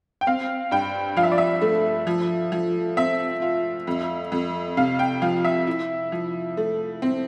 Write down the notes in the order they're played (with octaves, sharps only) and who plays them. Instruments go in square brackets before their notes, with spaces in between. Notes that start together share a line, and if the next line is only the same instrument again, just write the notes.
[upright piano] G5
[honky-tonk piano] C4 [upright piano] F5
[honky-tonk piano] G2 [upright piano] G5
[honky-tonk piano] F3 [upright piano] F5
[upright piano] E5
D5
E5
[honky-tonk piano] A3
F3
F3
[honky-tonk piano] C4 [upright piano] E5
[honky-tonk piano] F4
F2
F2
[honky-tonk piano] C3 [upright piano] F5
[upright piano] G5
[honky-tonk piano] F3 [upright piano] F5
[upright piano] E5
[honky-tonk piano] E4
F3
A3
C4